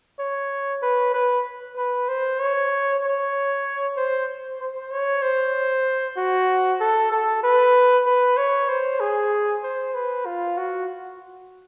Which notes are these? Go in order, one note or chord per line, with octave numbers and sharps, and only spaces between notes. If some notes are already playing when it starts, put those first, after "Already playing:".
C#5
B4
B4
B4
C5
C#5
C#5
C5
C5
C#5
C5
F#4
A4
A4
B4
B4
C#5
C5
G#4
C5
B4
F4
F#4